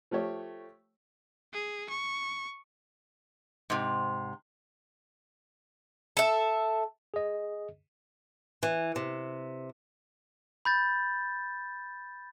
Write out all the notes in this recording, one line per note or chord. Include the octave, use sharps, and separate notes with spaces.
F3 A3 G4 C#5
G#4
C#6
G#2 C3
A4 E5
G#4 D#5
E3
C3
B5 G6 A6